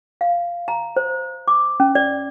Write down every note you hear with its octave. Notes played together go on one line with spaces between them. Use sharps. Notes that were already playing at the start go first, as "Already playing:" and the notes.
F5
A#5
C5
D6
C#4
D5